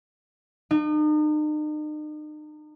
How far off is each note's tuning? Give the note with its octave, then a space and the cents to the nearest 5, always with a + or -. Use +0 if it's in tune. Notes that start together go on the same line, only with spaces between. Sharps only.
D#4 -40